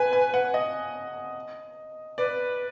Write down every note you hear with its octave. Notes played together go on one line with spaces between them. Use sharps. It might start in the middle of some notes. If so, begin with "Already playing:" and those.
Already playing: B4 G#5
G#5
F#5
D#5
B4 D5